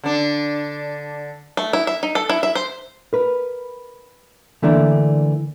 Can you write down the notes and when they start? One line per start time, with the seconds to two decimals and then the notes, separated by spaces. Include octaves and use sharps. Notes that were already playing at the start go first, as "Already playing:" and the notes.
0.04 D3 D4
1.57 A3
1.73 E4
1.87 E5
2.03 D#4
2.15 A4
2.30 E4
2.43 E5
2.55 C5
3.13 A#4 B4
4.62 D3 E3 A3 A#3 D4